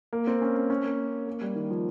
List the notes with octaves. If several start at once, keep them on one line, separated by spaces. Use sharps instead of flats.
A#3
C4
C#4
C#4
C#4
A#3
A#3
G3
D#3
F3